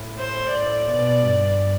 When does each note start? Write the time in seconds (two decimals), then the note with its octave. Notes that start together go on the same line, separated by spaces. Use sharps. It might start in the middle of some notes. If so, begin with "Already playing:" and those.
Already playing: A2
0.19 C5
0.52 A2 D5
0.87 B2
1.22 G2